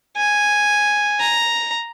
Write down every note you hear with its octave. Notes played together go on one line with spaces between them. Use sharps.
G#5
A#5